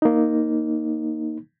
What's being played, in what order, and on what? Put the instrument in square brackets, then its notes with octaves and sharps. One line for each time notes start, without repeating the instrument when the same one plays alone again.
[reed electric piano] A#3 D#4